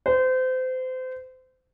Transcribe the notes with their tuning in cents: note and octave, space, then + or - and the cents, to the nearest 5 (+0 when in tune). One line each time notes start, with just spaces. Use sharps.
C5 -30